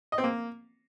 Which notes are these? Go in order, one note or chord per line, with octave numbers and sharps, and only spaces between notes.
D#5
C4
A#3